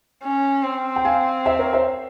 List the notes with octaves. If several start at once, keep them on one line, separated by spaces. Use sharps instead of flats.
C#4
C4
G5
F5 G#5
C5 E5
A#4 C#5
C5 E5